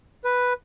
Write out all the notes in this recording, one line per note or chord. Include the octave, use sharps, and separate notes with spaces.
B4